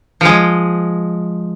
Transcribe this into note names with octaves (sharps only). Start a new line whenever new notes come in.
F3 G#3